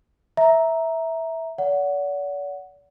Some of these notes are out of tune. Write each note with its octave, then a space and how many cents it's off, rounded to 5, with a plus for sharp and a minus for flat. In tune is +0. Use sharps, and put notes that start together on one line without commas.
E5 -10 A#5 +0
D5 -45 F#5 +0